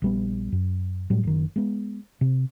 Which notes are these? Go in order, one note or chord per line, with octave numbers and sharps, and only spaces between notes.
A#1 G3 B3
F#2
A2 F#3 G3
F#1 D#3
G#3 B3
C3